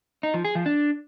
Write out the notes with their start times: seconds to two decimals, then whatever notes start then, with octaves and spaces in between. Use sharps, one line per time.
0.23 D#4
0.34 F3
0.45 G#4
0.55 F3
0.66 D4